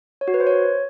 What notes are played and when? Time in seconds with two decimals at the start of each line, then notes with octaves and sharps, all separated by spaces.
0.21 C#5
0.28 F#4
0.34 B4
0.40 C5
0.47 C#5